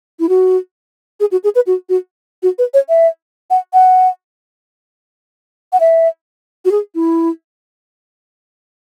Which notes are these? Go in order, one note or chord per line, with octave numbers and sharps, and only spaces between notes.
E4
F#4
G#4
F#4
G#4
B4
F#4
F#4
F#4
B4
C#5
E5
F#5
F#5
F#5
E5
F#4
G#4
E4